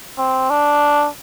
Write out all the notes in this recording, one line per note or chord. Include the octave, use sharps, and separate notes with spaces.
C4
D4